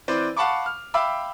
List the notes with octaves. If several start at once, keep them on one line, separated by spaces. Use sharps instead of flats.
E3 C4 B4 C5 D5
F5 F#5 A5 B5 C#6 D6
F6
E5 F5 G5 B5 D6 E6